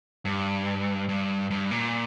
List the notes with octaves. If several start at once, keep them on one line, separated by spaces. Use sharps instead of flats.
G2
G2
G2
A#2